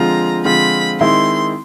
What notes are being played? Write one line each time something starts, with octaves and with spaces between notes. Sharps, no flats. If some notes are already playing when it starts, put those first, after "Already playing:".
Already playing: D3 F3 G#3 C4 F4 A#5
D3 F3 G#3 C4 F4 B5
D#3 G#3 C4 E4 C6